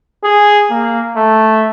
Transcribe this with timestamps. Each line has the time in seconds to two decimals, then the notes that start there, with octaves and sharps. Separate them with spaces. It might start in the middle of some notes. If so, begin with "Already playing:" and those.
0.24 G#4
0.70 A#3
1.17 A3